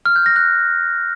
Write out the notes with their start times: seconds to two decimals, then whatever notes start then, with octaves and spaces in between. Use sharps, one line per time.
0.06 F6
0.16 G6
0.26 A#6
0.36 F#6